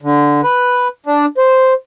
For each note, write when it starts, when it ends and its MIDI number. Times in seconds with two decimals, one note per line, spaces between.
0.02 0.41 50
0.43 0.88 71
1.06 1.26 62
1.38 1.73 72